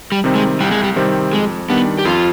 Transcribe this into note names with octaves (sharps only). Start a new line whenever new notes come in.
G3
C3 D#3 G3 C4
G#3
C2 G3
G#3
G3
C3 D#3 G3 C4
F2 G#3
D#3 G3 B3 D4
G4
F2 F4